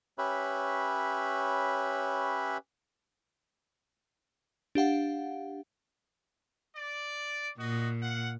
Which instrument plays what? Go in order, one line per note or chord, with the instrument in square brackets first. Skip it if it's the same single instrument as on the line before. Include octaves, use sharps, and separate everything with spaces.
[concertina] C#4 G4 B4 C#5 E5 B5
[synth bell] D4 G4 F5 F#5
[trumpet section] D5
[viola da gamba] A#2 [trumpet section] F#4 D#5
[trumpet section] F5 F#5